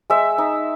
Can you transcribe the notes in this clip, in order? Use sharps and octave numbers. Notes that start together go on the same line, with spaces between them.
G#3 E5
D#4